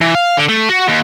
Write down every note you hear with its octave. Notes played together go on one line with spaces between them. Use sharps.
E3
F5
D3
A3
F#4
D#2